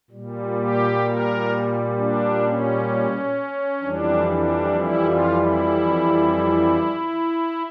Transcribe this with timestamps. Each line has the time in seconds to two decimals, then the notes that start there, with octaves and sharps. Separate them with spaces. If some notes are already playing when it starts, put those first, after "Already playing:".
0.11 A#2 G3
0.58 G4
1.04 A#4
1.96 D4
2.43 C#4
3.81 F2 E3 G3 D4
4.27 D4
4.75 E4
5.05 F4
5.36 E4